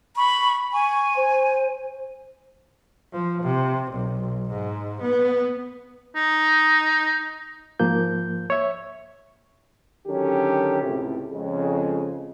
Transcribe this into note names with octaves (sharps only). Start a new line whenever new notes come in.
B5 C#6
G#5 C#6
C5
F3
C3
B1
G#2
B3
D#4
G#2 F3 A#3 G6
C#5 E5
D3 D#3 F#3 C#4 G4 A4
C#2 A2 C3
F2 C#3 G#3